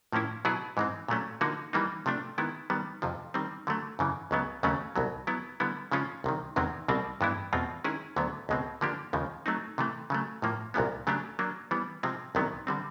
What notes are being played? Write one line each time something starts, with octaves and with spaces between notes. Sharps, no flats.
A2 F3 A#3 C#4 E4
B2 F#3 B3 E4 G#4
G#2 E3 G#3 C4
A#2 F#3 A3 C#4
D3 F3 A#3 D#4 F#4
E3 G3 A#3 D#4
C3 F3 A3 D4
D#3 G#3 B3 E4
D#3 G3 B3
F2 C3 F3
D#3 G3 C4
D3 F#3 A3
F#2 C#3 E3
C#2 C#3 F#3 B3
D#2 C#3 F#3 A3 C#4
C2 B2 F#3
F#3 B3 E4
D3 G3 B3 E4
C#3 F3 G#3 C#4 F4
C2 C3 D#3
E2 C3 D#3 G#3 C4
C2 B2 G3 C4
G2 E3 G#3 B3 E4
E2 B2 G#3 C4 F4
D#3 G#3 C#4 E4 G#4
D2 D3 F#3 B3
C#2 B2 G#3 C4
D3 F3 A#3 D4 G4
D#2 C#3 F3 G#3
F#3 A3 C4 D#4
C3 E3 A3
C#3 F#3 A3
A2 F3 A#3
C2 A#2 F3 G#3 B3
C#3 F#3 A3 D4 G4
F#3 A#3 D4
E3 G3 B3
C3 F3 G#3 C4
C2 C3 D#3 F#3 B3
D3 G3 C4